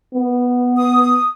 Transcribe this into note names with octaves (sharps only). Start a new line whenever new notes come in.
B3
D#6